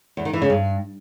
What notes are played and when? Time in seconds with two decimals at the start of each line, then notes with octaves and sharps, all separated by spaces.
0.17 E2
0.25 D#3
0.33 E3
0.42 C#3
0.50 G2